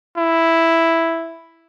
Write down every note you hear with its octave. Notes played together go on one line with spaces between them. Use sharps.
E4